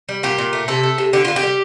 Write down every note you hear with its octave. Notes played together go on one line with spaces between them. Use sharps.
G3
A#2 G4
A#2
A3
C3 A4
A3
C3
D3 G4
D3 F4
G4
G3